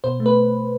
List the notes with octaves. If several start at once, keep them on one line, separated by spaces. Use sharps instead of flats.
B2 C5
A3
B4